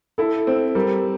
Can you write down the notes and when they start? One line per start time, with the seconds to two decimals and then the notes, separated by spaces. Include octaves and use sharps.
0.18 E4 A4
0.47 C4
0.75 G3 A#4